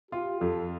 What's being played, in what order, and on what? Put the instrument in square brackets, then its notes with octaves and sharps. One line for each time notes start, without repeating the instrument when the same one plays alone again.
[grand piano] F4 [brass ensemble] G4
[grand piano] F2 [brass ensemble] A4